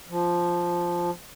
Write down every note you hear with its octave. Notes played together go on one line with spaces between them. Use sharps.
F3